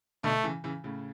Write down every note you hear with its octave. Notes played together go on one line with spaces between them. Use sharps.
B2 D3 A3
C#3 E3
C#3 E3
A2 C#3